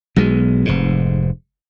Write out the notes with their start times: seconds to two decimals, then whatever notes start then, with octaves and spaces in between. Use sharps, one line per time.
0.16 B1 B2 G#3
0.65 F1 G#2